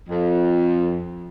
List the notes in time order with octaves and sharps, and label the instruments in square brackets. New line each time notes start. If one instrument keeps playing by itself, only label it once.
[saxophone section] F2